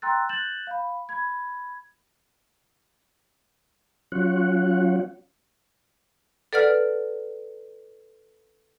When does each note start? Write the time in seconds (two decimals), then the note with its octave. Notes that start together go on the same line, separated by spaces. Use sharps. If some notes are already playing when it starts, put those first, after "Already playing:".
0.02 G5 A#5 C6 E6 F#6 A6
0.29 F#6 G6 A6 E7 F#7
0.67 F5 B5
1.09 B5 G#6
4.12 F#3 C#4 F4 F#5
6.53 A4 B4 D5 F#5 F6